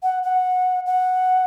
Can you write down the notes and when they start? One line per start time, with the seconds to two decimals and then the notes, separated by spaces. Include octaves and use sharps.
0.03 F#5
0.23 F#5
0.86 F#5